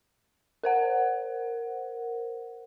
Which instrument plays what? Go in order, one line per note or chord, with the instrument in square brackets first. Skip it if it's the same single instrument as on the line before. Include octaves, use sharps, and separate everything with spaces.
[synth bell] A#4 C5 F#5